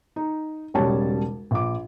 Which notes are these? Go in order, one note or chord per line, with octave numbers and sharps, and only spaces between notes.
D#4
E1 B1 C#3 G3 C#5 A5
A#1 D6